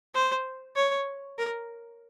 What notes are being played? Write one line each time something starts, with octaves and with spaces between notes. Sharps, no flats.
C5
C#5
A#4